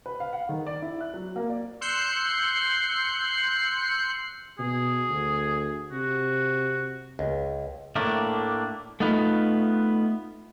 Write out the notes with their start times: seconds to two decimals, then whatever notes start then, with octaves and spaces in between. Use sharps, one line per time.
0.06 B4
0.20 F5
0.33 F#5
0.49 D#3
0.67 D5
0.82 E4
1.01 F#6
1.14 F#3
1.36 A#3
1.49 D5
1.81 C6 E6 F#6 G6 C7 C#7
4.58 B2 G#4
5.08 D2
5.92 C3 F#4
7.19 C#2
7.96 A2 A3 A#3 D4
9.00 A3 B3 D#4 F4 B4